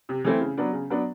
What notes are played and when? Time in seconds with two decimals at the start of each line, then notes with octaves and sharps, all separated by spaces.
0.09 C3
0.24 E3 A3 C4 E4
0.41 C#3
0.57 F#3 B3 D4
0.73 C#3
0.90 F#3 B3 D4